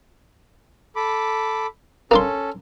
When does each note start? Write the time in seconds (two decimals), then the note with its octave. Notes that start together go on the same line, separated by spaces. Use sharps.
0.96 A4 B5 D6
2.11 A#3 C#4 D4 A4 C6